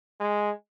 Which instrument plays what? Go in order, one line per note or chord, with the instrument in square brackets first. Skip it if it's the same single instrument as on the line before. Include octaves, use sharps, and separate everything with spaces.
[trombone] G#3